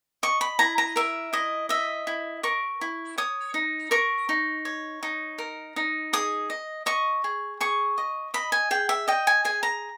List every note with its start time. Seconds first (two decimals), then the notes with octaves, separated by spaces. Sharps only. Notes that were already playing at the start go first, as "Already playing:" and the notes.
0.23 D#5 C#6
0.41 B5
0.59 E4 A#5
0.78 A#5
0.96 A#4 E5
1.33 E4 D#5
1.69 D#5 E5
2.07 E4
2.43 A#4 C#6
2.81 E4
3.18 C#5 D#6
3.54 D#4
3.91 A#4 C#6
4.29 D#4
4.65 C#5
5.03 D#4
5.38 A#4
5.76 D#4
6.13 G#4 D#6
6.50 D#5
6.86 D#5 C#6
7.24 G#4
7.61 G#4 C#6
7.98 D#5
8.34 D#5 B5
8.52 G#5
8.71 G#4 G5
8.89 E5
9.08 D#5 G5
9.27 G#5
9.45 G#4 G#5
9.63 A#5